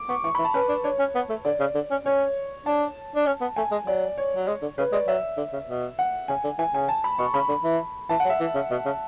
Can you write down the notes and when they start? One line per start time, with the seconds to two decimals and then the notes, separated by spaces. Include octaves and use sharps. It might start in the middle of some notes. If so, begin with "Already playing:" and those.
Already playing: D6
0.09 B3 C#6
0.24 E3 C#6
0.35 E3 B5
0.45 A5
0.54 C#4 B4
0.69 D4
0.84 D4 C#5
0.99 C#4
1.15 B3
1.29 A3
1.45 D3 D5
1.60 C#3
1.75 D3
1.91 C#4
2.05 C#4 C#5
2.66 D4 A5
3.15 D4
3.26 C#4
3.41 B3
3.56 A3 G#5
3.71 G#3
3.86 F#3 D5
4.18 C#5
4.36 F#3
4.48 G#3
4.62 D3
4.78 C#3 B4
4.92 G#3 D5
5.07 F#3 E5
5.37 D3
5.53 C#3
5.67 B2
5.99 F#5
6.28 C#3 G#5
6.44 D3
6.58 E3 G#5
6.73 C#3 G#5
6.88 A5
7.04 B5
7.19 B2 C#6
7.34 C#3 B5
7.49 D3
7.64 E3
8.09 E3 A5
8.20 F#5
8.25 F#3
8.30 E5
8.40 E3
8.55 C#3
8.71 B2
8.85 C#3